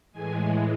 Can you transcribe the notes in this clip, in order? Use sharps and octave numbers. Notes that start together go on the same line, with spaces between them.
A2 E3 G#3 G#5